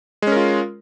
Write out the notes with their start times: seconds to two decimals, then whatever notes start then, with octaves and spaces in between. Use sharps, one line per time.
0.22 G#3
0.27 C#4
0.32 A#4
0.37 F4